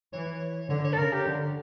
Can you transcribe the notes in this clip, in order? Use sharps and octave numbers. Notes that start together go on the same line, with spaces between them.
E3 C#5
D3 C#5
C#5
A4
C#3 A#4
G4
D3